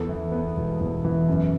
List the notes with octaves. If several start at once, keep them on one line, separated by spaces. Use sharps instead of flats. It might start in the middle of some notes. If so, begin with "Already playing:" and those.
Already playing: E2 A4
E3
B3
E1
E2
E3
F#2